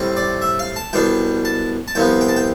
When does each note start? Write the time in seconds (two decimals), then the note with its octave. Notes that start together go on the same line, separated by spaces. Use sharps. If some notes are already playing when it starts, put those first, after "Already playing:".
Already playing: A2 G3 C4
0.16 D5
0.42 E5
0.59 F5
0.76 A5
0.93 C2 B2 B3 D4 G5
1.45 A5
1.88 A5
1.95 C2 C3 F3 B3 G5
2.21 G5
2.29 A5
2.36 G5